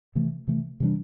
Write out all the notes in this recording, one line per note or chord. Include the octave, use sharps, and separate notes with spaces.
C3 E3 A3
C3 E3 A3
C3 E3 G3 D4